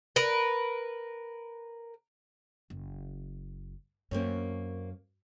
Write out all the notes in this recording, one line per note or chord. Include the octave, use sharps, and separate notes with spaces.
A#4 B4
F#1
F#2 A#3 C4 C#4